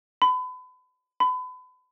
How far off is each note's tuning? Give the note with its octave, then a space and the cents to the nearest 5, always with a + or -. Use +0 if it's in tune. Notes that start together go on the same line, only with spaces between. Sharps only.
B5 +35
B5 +35